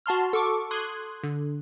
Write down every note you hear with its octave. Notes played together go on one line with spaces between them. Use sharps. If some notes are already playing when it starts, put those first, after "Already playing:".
F#4 A5 C6 F6
A4 C#6 D6
C6 D#6 F#6 G#6
D3